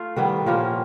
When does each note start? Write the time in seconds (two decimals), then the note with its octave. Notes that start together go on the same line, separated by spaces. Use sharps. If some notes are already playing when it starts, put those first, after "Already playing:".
Already playing: A3 F4
0.16 D#3 G3 B3 E4
0.46 A#2 F3 A#3 C#4